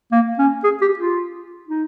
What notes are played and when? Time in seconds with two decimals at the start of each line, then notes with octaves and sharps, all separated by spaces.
0.12 A#3
0.39 C#4
0.64 G#4
0.81 G4
0.99 F4
1.68 D#4